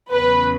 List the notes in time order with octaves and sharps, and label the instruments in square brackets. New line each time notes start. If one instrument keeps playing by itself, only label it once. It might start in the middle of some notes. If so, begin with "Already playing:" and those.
[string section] E2 C#3 F#3 B4